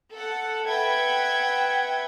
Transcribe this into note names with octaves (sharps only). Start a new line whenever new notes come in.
A4 F#5
B4 E5 F#5 G5 G#6